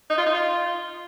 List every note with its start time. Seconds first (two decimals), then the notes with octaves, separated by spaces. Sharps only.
0.10 D#4
0.18 F4
0.26 D#4
0.34 F4